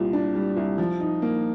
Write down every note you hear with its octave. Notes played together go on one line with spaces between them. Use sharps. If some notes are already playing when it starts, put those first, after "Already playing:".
Already playing: C2 A#2 G3
D4
G3
C2
F3
D#4
A#3